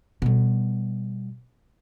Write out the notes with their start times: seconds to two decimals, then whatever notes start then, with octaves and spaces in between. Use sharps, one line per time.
0.22 B2 G3